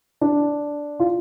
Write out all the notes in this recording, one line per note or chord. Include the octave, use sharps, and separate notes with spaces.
D4
F4